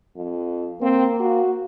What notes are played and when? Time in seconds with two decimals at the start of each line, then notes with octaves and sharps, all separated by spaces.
0.16 F2
0.82 A#3 C4
1.20 F#4